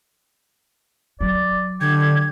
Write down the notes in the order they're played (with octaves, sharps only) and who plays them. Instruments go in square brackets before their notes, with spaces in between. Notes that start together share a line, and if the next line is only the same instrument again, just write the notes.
[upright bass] F#3 [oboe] D5
[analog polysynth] D3 [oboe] G4 [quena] G#6